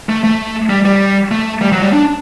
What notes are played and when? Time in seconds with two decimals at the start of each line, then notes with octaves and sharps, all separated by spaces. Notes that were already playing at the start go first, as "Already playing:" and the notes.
0.09 A3
0.24 A3
0.70 G3
0.85 G3
1.31 A3
1.62 G3
1.72 F#3
1.82 G3
1.93 D4